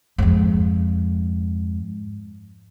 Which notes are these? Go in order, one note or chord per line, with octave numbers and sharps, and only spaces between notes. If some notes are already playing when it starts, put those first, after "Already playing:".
F2 G#2